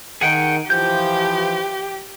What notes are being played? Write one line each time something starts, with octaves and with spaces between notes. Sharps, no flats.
D#3 G#4 F#5 G5
E3 F3 G4 G6